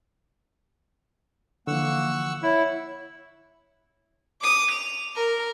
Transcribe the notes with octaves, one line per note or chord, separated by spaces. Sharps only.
D3 E3 F3 A#3 F#5 C#6 E6
E4 C#5
D6 D#6
F7
A#4